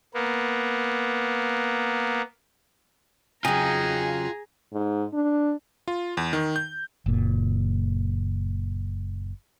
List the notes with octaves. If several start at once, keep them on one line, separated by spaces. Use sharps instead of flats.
A#3 B3
C#3 F#3 D#4 F4 G#4 G5 G#5 A#5
G#2
D4
F4
E2
D#3
G6
F#1 A#2